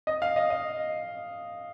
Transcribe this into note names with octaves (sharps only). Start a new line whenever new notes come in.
D#5
F5
D#5
D#5